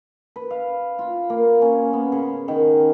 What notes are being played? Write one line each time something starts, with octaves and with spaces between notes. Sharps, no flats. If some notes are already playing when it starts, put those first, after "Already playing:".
B4
F5
F4
A#3
C#4
B3
C#3
D#3